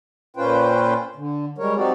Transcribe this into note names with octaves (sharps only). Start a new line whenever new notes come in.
A#2 C#4 F4 B4 C5 G5
D3
G3 G#3 A#4 C#5
F#3 C4 D#4 F#4 G4 D5